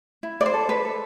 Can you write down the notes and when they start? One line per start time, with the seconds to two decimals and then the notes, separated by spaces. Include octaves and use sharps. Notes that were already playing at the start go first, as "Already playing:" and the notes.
0.23 E4
0.41 D5
0.46 C5
0.54 A4
0.69 B4
0.85 A4